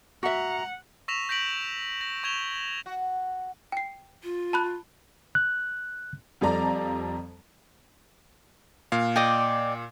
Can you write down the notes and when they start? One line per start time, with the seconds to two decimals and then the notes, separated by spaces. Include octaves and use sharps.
0.23 F#4 E5 F#5 A#5
1.08 C#6 E6 A#6 B6 E7 F7
1.29 G6 A#6 B6 D7 F#7
2.01 A#6
2.24 C#6 G#6 E7 F7 G7
2.86 F#4
3.72 G5 C7
4.23 F4
4.53 A5 B5 F#6
5.35 F#6
6.41 F2 F3 G3 A4 D5 A#5
8.92 A#2 F5
9.16 D5 D#5 G5